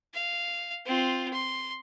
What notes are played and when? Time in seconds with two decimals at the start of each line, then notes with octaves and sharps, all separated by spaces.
0.14 F5
0.86 C4 F4
1.33 C6